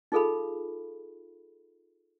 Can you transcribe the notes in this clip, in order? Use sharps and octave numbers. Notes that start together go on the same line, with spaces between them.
D#4 F4 G#4 A4 F5 B5